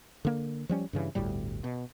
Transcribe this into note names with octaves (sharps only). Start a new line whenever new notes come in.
D3 A#3
F3 G3 C#4
G2 C#3 E3
G1 D2 A2 G3
B2